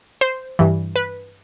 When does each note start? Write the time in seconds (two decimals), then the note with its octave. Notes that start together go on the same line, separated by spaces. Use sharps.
0.21 C5
0.59 G2 E3
0.96 B4